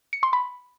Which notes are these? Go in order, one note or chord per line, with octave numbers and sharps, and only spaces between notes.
C#7
C6
B5